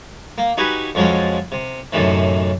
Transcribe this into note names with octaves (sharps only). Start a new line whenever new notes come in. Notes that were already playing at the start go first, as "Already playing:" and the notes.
A#3
D#4 F#4 G4 B4 G#5
F2 F3 F#3 G#3 C#4
C3
F#2 A2 C3 D#3 E3